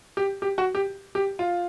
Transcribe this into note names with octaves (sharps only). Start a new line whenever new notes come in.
G4
G4
F#4
G4
G4
F4